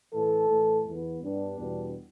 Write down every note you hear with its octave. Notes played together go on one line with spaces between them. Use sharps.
A2 E3 A3 A4
A2 E3 A3
E2 E3 B3
G2 G3 B3 D4
E2 B2 G3 B3